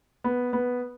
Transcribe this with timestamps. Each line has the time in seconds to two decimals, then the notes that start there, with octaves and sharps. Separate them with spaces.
0.24 B3
0.53 B3